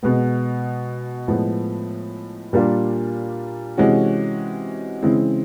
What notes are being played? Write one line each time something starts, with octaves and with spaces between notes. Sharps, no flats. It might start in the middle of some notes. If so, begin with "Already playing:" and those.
B2 G#3 B3
A2 F3 G#3 B3
A#2 G3 A#3 D4 F4
C3 E3 G#3 C#4 F#4
C#3 E3 G#3 C4 E4